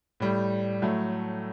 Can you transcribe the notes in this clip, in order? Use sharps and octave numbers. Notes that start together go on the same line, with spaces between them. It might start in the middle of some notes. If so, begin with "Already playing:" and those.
A2 G3
A2 F#3 A3